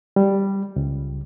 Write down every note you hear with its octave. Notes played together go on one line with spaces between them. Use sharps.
G3
C#2